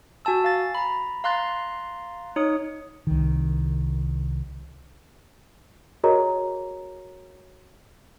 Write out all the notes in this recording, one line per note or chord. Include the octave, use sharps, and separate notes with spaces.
F#4 G#5 A5 E6
F5 A6
A#5 B5
F5 A#5 C6 F#6 A6
D#4 C#5 D#6
C2 D#3
F#4 G#4 A#4 C#5 D#5 A#5